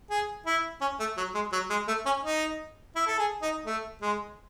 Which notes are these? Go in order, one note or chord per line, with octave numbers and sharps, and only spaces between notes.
G#4
E4
C#4
A3
F#3
G#3
F#3
G#3
A3
C#4
D#4
E4
A4
G#4
D#4
A3
G#3